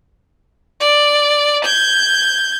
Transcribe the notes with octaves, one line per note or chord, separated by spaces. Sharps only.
D5
G6 G#6